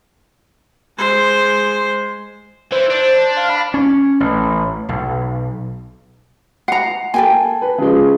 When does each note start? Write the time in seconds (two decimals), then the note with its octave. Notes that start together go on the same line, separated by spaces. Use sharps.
0.97 G#3 C5
2.72 E3 C5
2.90 D4
3.37 F5
3.50 B5
3.74 C#4
4.20 A1
4.89 B1
6.68 F#5 A#5 C7
7.14 A#3 A4 G5 G#5
7.62 B4
7.78 C#3 F3 G#3